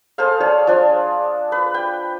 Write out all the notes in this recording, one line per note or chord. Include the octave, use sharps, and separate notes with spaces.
G#4 A4 C5 F5
G#4 C#5 D5
F3 D4
B4
G5